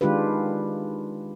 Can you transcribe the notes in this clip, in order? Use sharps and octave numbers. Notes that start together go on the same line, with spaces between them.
D#3 G#3 D4 F4 G4 B4